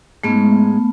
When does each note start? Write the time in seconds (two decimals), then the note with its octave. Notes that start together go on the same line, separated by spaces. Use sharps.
0.23 G#2 G#3 A3 B3 C#4